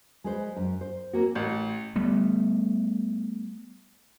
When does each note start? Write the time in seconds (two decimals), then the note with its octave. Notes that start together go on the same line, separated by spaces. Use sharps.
0.24 G#3 B4 C5
0.57 F#2
0.81 C5
1.13 A#3 C4 C#4 F#4
1.35 A1
1.96 G3 A3 B3